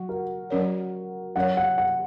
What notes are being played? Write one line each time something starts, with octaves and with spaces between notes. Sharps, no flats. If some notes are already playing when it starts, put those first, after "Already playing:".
Already playing: F#3 F#4
A#4
F#3 C#4 A#4 C#5
F#3 C#4 A#4 C#5 F#5
F#5
F#5